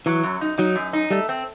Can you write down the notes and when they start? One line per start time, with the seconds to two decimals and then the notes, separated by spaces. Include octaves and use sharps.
0.06 E3 F#3
0.23 F#2
0.41 D#4
0.58 F#3 D#4
0.76 F#2
0.93 D#4
1.11 G3 A3
1.29 C4